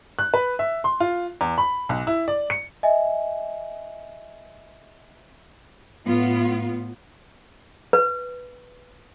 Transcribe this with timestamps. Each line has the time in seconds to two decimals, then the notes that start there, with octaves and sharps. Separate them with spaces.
0.19 F#6
0.34 B4
0.59 E5
0.84 C6
1.00 F4
1.41 E2
1.58 B5
1.89 B1
2.07 E4
2.28 D5
2.50 C#7
2.83 D#5 E5 G#5
6.05 A2 B3 F4
7.93 B4